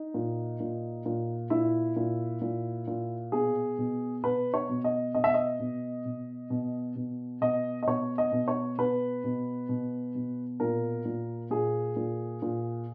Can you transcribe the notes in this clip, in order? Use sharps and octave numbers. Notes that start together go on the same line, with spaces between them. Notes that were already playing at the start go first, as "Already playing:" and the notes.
Already playing: D#4
A#2
A#2
A#2
A#2 E4
A#2
A#2
A#2
B2 G#4
B2
B2 B4
C#5
B2
D#5
B2 D#5
E5
D#5
B2
B2
B2
B2
B2 D#5
D#5
B2 C#5
D#5
B2
C#5
B2 B4
B2
B2
B2
A#2 A#4
A#2
A#2 G#4
A#2
A#2